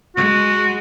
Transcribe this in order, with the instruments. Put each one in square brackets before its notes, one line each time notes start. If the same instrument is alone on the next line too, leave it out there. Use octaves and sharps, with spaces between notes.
[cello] G#3 [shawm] F#4